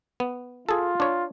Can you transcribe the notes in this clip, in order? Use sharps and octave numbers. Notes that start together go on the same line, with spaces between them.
B3
F4 G#4 A4
D4 C#5